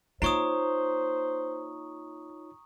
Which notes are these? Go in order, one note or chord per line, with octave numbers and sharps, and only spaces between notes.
A#3 D#4 F4 C5 C#5 A#5 C#6 D#6